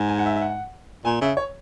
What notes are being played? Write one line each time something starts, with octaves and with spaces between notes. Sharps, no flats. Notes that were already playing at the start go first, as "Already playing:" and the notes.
Already playing: G#2
G#5
F#5
E5
E5
F#5
A#2 G#5
C#3 E5
C#5